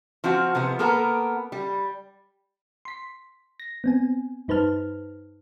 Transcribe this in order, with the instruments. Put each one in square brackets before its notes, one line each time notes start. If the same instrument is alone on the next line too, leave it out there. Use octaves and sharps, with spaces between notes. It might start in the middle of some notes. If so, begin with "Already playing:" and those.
[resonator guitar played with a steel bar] F3 C4 F4 F#4
C3 F3 B3
A#3 B3 A4 A#4
G3
[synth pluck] C6 B6
A#6
B3 C4 G#5
G2 D#4 B4 C5 A5 F6